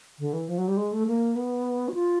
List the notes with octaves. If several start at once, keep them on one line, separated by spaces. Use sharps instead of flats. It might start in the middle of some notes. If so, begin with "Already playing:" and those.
D3
E3
F3
F#3
G3
G#3
A3
A#3
B3
F#4
F4